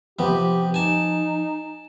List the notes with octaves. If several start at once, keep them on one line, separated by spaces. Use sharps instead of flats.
C3 F3 B3 G4
D#4 G#5 A5